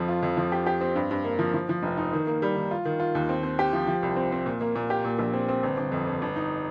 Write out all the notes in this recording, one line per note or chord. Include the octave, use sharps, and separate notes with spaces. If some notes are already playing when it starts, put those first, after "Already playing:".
Already playing: F2 F3
F4
F2
F3
G4
G4
C4
G2
G2
A#3
F3
F3
F3
F1
D#4
D#3
A#3
G3
D#3
F4
D#3
F4
D#2
C4
C4
G4
F3
F3
C2
C4
C4
A#2
A#3
A#2
G4
A#2
A#1
C4
C4
G1
G1
F2
G1
G1
D#4